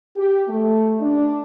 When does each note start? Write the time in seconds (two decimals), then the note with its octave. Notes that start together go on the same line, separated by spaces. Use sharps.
0.17 G4
0.48 A3
1.01 D4